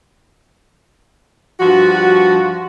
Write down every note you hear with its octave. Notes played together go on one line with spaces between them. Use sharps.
G2 F3 F#4